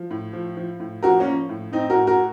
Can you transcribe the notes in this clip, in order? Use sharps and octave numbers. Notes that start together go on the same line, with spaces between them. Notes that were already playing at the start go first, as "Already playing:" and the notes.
Already playing: F3
A2
F3
F3
A2
F3 F#4 A#4
A#3 C#4
F3
A2
A2 C4 D#4
F#4 A#4
A2
F#4 A#4